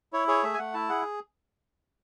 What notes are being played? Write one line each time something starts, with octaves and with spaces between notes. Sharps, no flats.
E4 C#5
G#4 C#5
A3 E5
G#5
A3 F#5
E4 A5
G#4 F#5